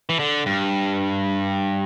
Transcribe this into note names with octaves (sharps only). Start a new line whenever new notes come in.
E3
D3
G2